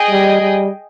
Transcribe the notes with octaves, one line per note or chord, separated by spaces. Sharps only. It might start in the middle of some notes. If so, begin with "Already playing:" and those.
Already playing: G#4 D#5 G5
G3
G3